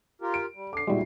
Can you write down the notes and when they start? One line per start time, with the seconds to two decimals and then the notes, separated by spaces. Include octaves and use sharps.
0.21 F4 G4 A#4
0.34 D7
0.56 G3
0.73 D3 A4 D6 C7
0.87 A#2 G3 G#3 D#4 E4 F#4